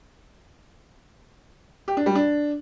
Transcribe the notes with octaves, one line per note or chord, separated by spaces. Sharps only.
G4
D4
G3
D4